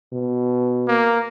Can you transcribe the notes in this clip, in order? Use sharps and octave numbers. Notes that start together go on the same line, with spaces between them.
B2
A#3